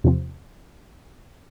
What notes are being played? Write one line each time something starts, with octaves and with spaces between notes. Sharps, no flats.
E2 C3 F3 C4